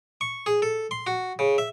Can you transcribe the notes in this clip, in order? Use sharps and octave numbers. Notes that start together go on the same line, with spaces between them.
C#6
G#4
A4
C6
F#4
C#3
E5